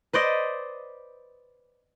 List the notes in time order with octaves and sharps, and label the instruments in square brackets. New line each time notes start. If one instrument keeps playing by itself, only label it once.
[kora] B4 C5 D5 D#5